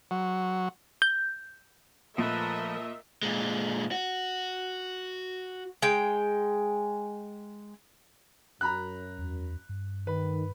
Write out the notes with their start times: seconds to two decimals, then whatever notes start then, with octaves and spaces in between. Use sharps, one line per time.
0.11 F#3
1.02 G6
2.18 A#2 F3 A3 A#4 B4 D#5 E5
3.23 A#2 G#3
3.92 F#4
5.82 G#3 G5
8.61 F#2 A#5 B5 F#6
9.18 E2
9.69 G2
10.07 D#3 B4